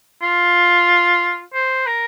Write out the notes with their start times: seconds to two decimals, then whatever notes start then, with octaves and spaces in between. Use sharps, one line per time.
0.22 F4
1.54 C5
1.86 A#4